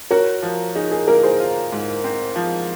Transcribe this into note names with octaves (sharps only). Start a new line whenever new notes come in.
F#4 A#4 C#5
F3
D#4 G#4
G#4
A#3 A#4
G#4 C5
F4
G#2
C4
F3